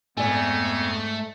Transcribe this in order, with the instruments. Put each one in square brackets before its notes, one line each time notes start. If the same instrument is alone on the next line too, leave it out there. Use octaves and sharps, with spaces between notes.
[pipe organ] F2 B3 [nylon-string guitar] G#2 D5 G#5 [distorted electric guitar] A3